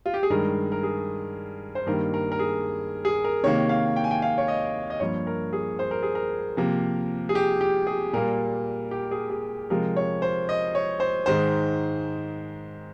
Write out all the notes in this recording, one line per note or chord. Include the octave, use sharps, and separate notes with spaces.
F4
G4
G#4
G2 D#3 G#3 A#4
A#4
G#4
C5
G2 D#3 G3 A#3 A#4
A#4
A#4
G#4
G#4
A#4
C3 D#3 A#3 C#5
F5
G5
G#5
G5
F5
C#5
D#5
D#5
G2 F3 A#3 C#5
A#4
G#4
C5
A#4
G#4
A#4
C3 F3 A#3
G#4
G4
G4
G#4
A#2 G3 A#3 A#4
G4
G#4
G#4
C3 F3 G#3 A#4
C#5
C5
D#5
C#5
C5
G#2 D#3 G#3 C5